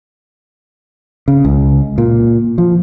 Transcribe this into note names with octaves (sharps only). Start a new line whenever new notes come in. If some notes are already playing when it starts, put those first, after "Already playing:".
C#3
C#2
A#2
F3